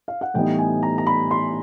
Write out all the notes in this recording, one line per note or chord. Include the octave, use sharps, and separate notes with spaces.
F5
F#5
A2 E3 G3 B3 D#4 G5
G#5
A#5
A#5
B5
C6